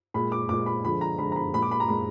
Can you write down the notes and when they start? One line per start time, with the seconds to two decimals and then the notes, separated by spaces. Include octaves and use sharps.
0.14 A#2 G#3 B5
0.32 D6
0.49 A#2 G#3 D6
0.66 B5
0.84 D3 F3 G#3 B5
1.01 A#5
1.19 D3 F3 G#3 B5
1.32 A#5
1.36 B5
1.54 A#2 G#3 B5
1.62 D6
1.71 B5
1.80 A#5
1.88 A#2 G#3 B5